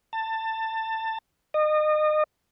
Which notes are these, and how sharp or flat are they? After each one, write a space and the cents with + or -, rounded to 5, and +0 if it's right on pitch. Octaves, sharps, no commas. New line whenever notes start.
A5 +20
D#5 -30